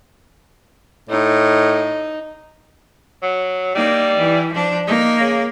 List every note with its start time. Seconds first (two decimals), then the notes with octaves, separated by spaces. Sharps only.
1.09 A2 D#4
3.23 F#3
3.75 G3 A#3 D#4
4.18 E3
4.52 F3 D4
4.88 A#3 D#4
5.20 C#3